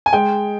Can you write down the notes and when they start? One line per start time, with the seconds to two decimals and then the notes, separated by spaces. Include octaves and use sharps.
0.06 G#5
0.13 G#3 G5